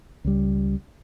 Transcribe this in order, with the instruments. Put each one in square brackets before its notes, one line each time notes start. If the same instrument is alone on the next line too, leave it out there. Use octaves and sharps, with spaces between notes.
[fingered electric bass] C#2 G3